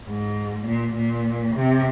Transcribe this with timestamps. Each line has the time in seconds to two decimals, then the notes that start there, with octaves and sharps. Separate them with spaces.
0.09 G#2
0.67 A#2
0.96 A#2
1.55 C3